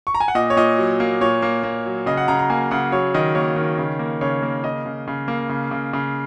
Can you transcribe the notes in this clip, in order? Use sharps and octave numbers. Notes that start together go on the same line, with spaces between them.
C#6
A#5
G#5
F#5
A#2 D#5
C#5
A#2 D#5
F#3
A#3
A#2 C#5
A#3
A#3
F#3
C#3 D#5
F#5
C#3 A#5
A#5
A#3 G#5
C#3 F#5
F#3 C#5
D#3 D#5
A#3 C#5
D#3
C#3
A#3
C#3 C#5
A#3
C#3 D#5
C#3
C#3
A#3
C#3
C#3
C#3